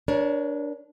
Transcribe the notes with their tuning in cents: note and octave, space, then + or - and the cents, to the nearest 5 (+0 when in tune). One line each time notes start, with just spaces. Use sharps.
D4 -10 A#4 +30 C#5 +10